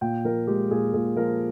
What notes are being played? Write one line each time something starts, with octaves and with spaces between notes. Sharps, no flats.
A#2 G5
F3 A#4
G#3 G4
A#2 G#4
A#2 G#4
F3 A#4